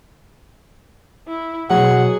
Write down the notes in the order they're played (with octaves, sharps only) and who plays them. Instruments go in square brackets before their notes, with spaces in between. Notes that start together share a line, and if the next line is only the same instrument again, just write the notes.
[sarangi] E4
[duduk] B2 [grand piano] F#3 [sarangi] G#4 [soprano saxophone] F#5